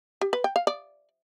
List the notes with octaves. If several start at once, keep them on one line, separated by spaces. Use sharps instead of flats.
G4
B4
G5
F5
D5